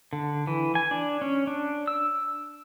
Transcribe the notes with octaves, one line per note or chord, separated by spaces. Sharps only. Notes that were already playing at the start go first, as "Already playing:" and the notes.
D3
E3
G#5
D4
C#4
D4
E6